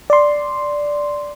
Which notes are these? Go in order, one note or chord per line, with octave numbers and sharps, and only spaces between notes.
D5 C6